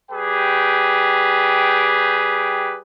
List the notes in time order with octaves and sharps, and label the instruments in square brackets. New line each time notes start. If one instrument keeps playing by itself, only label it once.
[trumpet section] G3 G4 G#4 B4 G5